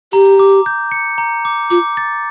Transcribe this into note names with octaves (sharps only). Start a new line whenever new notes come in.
G4 A#5
D6
G6
C#7
A#5
D6
F4 D6
A6